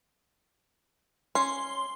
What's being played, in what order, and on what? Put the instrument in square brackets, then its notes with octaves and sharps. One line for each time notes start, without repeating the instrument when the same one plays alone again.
[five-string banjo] C#4 [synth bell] C6